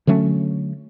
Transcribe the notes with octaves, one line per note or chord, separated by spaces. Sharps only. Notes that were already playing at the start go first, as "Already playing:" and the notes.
D3 F#3 A3 C#4